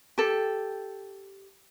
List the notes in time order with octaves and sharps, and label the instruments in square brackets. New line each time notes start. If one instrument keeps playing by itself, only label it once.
[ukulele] G4 A4